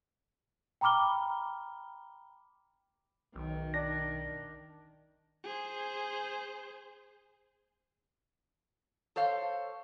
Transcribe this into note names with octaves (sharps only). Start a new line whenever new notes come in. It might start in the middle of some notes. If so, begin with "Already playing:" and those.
G5 A#5 B5 D6 F6 G7
B1 D#3
D4 A#6
G#4 C5
A4 C5 C#5 F5